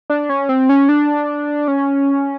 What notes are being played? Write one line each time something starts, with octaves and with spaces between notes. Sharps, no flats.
D4
C#4
C4
C#4
D4
C#4